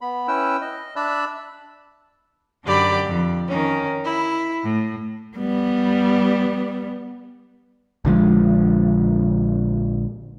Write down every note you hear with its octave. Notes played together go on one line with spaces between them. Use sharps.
B3 B5
C#4 E4 B4 G5 E6
D#5
D4 D5 E5 B5 E6 F#6
F#2 D3 G4 D5 B5
F2
D#3 C#4
E4
A2
G3 B3
A#1 D3 F3 G#3